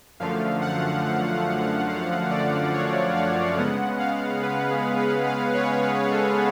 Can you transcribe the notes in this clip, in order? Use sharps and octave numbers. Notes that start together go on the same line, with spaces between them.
F#2 D3 F3 A3 F5
F#5
F5
D5
C#5
F5
C#3 G#3 B3 F#5
F5
B4
G#4
B4
F5
C#5
B4
A4